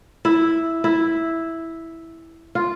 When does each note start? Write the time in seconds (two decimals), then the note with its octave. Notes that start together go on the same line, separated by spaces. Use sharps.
0.25 E4
0.84 E4
2.55 F4